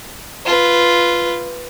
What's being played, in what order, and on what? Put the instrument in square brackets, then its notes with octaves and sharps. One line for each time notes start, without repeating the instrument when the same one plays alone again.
[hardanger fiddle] F4 B4